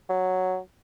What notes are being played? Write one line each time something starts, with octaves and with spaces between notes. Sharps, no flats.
F#3